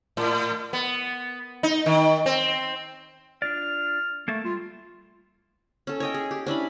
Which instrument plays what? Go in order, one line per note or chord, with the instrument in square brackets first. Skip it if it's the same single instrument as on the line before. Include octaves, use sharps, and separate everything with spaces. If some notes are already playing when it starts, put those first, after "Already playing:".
[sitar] A2
B3
D#4
D#3
C4
[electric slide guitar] D4 F4 D5 [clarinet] F6
[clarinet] A3 [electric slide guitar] A#3 A4
[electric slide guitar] G3 [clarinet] F4
[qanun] C#4 A4
C#5 D#5 G5
G#4
G4
C#4 D4 E4 B5